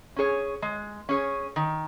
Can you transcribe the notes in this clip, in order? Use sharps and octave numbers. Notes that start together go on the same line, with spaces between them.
C#4 G#4 C#5
G#3
C#4 G#4 C#5
D#3